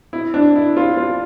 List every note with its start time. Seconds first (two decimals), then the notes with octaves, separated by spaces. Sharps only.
0.13 E4
0.34 D4
0.56 E4
0.77 F4
0.97 F4